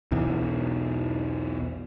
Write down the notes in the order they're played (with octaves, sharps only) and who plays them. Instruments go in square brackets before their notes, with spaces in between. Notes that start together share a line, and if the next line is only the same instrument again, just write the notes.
[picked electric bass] B1 E2 B2 E3